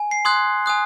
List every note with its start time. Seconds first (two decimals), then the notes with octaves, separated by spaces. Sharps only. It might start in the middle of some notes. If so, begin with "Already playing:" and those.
Already playing: G#5
0.11 C7
0.25 C6 D#6 F#6 G#6
0.66 G#5 D#6 F#6